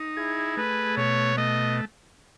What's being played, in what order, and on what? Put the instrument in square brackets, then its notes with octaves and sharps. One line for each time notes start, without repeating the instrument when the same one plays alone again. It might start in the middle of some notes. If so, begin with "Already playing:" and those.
Already playing: [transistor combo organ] D#4
[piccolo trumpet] E4 [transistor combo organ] G#4
[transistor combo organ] A3 [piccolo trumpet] B4
[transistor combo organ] B2 [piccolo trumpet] C#5
[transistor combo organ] A3 [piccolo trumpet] D#5